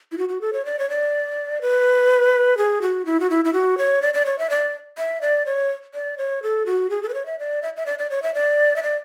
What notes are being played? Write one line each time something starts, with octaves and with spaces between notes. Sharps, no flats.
E4
F#4
F#4
A4
C#5
D5
C#5
D5
B4
G#4
F#4
E4
F#4
E4
E4
F#4
C#5
D5
D5
C#5
E5
D5
E5
D5
C#5
D5
C#5
A4
F#4
G#4
A4
B4
C#5
E5
D5
E5
E5
D5
D5
C#5
E5
D5
E5
D5